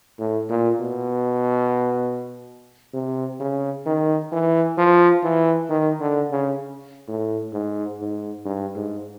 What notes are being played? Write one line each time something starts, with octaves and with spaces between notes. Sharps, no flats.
A2
A#2
B2
C3
C#3
D#3
E3
F3
E3
D#3
D3
C#3
A2
G#2
G#2
G2
G#2